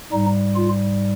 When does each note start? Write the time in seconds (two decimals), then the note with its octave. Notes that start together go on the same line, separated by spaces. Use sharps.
0.12 G#2 G3 D#4
0.56 F4